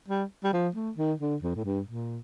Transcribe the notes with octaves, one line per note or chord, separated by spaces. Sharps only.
G3
G3
F3
A3
D#3
D3
F2
A2
G2
A#2